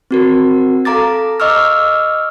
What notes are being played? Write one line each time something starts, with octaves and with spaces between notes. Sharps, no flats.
C4 F#4 A#4
A4 F5 A#5 D6 A6
D#5 C#6 D6 E6 F6